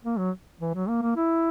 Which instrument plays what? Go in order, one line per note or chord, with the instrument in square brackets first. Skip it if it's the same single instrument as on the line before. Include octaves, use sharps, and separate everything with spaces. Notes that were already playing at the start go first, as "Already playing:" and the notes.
[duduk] A#3
F#3
E3
F#3
A#3
A#3
E4